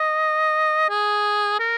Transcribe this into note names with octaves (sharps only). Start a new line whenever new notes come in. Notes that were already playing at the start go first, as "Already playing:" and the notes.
Already playing: D#5
G#4
A#4